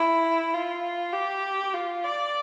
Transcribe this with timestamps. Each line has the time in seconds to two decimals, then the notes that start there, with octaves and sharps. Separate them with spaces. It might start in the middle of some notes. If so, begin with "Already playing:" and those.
Already playing: E4
0.54 F4
1.13 G4
1.73 F4
2.04 D5